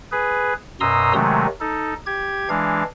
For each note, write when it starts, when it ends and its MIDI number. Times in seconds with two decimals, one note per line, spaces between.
0.12 0.54 68
0.12 0.54 71
0.80 1.13 42
0.80 1.13 47
0.80 1.13 82
0.80 1.13 84
0.80 1.13 87
0.80 1.13 88
1.13 1.46 48
1.13 1.46 51
1.13 1.46 54
1.13 1.46 56
1.13 1.46 57
1.60 1.94 63
1.60 1.94 69
2.06 2.49 67
2.06 2.49 92
2.49 2.83 52
2.49 2.83 56
2.49 2.83 62
2.49 2.83 77